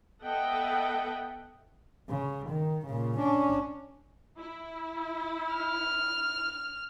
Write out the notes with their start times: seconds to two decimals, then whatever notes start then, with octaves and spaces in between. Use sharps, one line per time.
0.22 B3 A4 D#5 E5 F#5 G5
2.10 C#3
2.50 D#3
2.86 A#2 C#3
3.18 C#4 D4
4.38 E4
5.55 F6